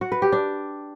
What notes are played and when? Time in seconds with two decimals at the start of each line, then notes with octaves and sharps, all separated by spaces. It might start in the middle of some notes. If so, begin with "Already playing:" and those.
0.01 F#4
0.12 B4
0.22 G4
0.32 D4